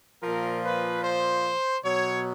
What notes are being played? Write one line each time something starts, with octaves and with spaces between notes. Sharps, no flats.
A#2 F3 A#4
B4
C5
B2 F#3 C#5